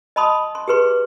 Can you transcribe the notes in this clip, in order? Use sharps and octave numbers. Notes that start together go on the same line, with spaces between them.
D#5 A5 B5 C6 D#6
C6
G4 G#4 B4 C6